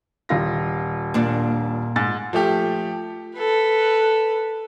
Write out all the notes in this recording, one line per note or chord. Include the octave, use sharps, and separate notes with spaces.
D#1 F4 A#6
A#2 D4
G#2 A6
F3 A3 G4
A4 B4